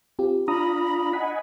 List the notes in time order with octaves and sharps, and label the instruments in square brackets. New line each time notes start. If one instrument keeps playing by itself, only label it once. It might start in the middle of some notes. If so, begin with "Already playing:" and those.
[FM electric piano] C4 F4 G4
[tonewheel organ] D4 F4 A#5 [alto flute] B5 [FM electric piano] D#6
[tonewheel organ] D#5 F#5 G#5 [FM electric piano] B6